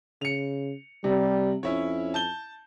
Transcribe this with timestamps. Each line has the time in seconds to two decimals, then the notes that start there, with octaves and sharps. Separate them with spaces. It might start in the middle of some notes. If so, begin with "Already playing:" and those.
0.21 C#3 C#7 F7
1.04 C3 G3
1.63 F2 C#4 E4 C#5
2.14 A5 G6 G7